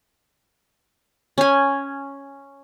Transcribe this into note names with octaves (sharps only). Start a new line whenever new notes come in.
C#4 G#5